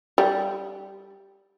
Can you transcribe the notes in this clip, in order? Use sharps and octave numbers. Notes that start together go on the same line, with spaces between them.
G3